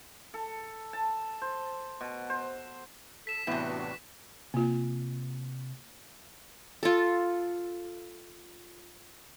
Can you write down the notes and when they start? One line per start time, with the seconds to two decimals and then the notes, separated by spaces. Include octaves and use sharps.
0.34 A4
0.93 A5
1.42 C5
2.01 B2
2.30 C5
3.27 A4 B6 E7
3.47 A1 A2 C3 E3 B3 D4 F#4 B4
4.54 C3 A#3 F4
6.83 F4 A4